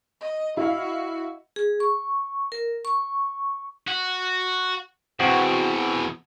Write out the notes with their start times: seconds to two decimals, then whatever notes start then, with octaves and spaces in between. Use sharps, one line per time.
0.21 D#5
0.57 E4 F#4 F5
1.56 G#4
1.80 C#6
2.52 A#4
2.85 C#6
3.87 F#4
5.20 E2 B2 C4 F#4